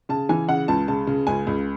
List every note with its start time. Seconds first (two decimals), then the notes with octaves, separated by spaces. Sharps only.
0.09 C#3 A5
0.29 E3 G#5
0.49 C#3 F#5
0.68 C#2 A5
0.88 C#3 A5
1.07 C#3
1.27 C#2 G#5
1.47 C#2